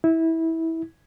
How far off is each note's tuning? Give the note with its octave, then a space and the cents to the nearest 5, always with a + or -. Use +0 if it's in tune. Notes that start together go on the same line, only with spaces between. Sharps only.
E4 -20